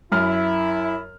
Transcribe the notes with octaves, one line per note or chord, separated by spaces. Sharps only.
F#2 E4 F6